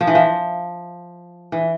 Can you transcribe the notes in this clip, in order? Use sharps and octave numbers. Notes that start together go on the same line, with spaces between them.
F3
E3
F3
E3